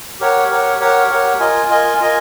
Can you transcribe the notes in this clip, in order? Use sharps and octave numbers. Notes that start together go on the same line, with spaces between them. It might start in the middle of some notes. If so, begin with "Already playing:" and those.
G4 A#4 C#5 F#5
G4 A#4 C#5 F#5
G4 A#4 C#5 F#5
G4 A#4 C#5 F#5
F4 A#4 D#5 G#5
F4 A#4 D#5 G#5
F4 A#4 D#5 G#5